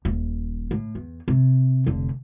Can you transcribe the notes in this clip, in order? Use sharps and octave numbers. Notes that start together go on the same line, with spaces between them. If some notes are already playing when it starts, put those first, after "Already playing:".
D#1
A2
E2
C3
F1 D3